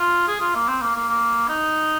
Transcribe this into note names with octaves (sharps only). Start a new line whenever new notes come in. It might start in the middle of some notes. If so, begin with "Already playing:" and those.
Already playing: F4
G#4
F4
A#3
C4
A#3
A#3
A#3
D#4